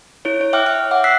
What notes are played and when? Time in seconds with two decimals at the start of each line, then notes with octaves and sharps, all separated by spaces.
0.25 E4 C#5
0.41 C#5
0.53 E5 G5 D6 F6 F#6
0.66 E5 F6
0.91 E5 F#5 D6
1.04 E6 F#6 B6 C7